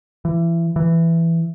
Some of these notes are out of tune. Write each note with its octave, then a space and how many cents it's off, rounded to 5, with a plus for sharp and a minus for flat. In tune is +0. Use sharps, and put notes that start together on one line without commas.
E3 +25
E3 +10